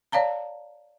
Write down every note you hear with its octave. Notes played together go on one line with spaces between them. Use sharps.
C#5 D5 F5 A5 A#5